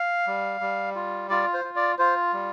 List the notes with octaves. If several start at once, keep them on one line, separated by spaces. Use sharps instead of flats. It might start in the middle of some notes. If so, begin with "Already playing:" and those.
Already playing: F5
G3
G3
F4
F4 D5
C5
F4
D5
F4 C5
G3